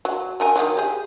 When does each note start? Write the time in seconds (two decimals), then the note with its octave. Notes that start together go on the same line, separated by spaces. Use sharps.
0.05 F#3
0.40 F#3 A#4 G#5
0.56 D#3 E3 F#3
0.77 G4 G#4